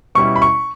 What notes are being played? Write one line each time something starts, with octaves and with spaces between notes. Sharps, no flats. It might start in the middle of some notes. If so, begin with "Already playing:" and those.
B2 G3 C#4 E4 C#6
B5
C#6